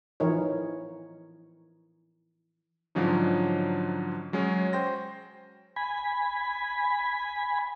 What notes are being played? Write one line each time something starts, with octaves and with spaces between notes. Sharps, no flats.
E3 F3 D#4 A#4 C#5
G#2 D3 F3 F#3 C#4 D#4
F#3 G#3 C#4
C5 G5 C6 A#6
G#5 B5